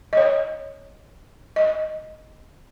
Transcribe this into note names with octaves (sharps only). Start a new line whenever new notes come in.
D#5
C#5
D#5